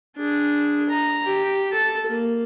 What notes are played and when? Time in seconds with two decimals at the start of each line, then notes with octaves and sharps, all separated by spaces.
0.17 D4 G#4
0.89 A#5
1.25 G4
1.72 A4 A5
2.06 A#3